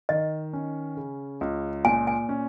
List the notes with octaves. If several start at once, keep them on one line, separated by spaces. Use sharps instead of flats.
D#3 D#5
C#4
C#3
C#2
A#2 G#5
G#5
C#4